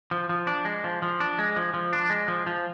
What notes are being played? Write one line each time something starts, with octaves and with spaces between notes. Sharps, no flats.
F3
F3
D4
G#3
F3
F3
D4
G#3
F3
F3
D4
G#3
F3
F3